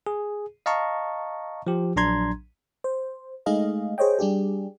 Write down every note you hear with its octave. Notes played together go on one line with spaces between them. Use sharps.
G#4
D#5 F5 A5 A#5 C#6
F3 G4
A#1 F#3 D4 A#5 C6 G#6
C5
G#3 A3 D#4 G#4 D#5 F5
G#4 C5 C#5 D#5 G5
G3 D4 G4 G#4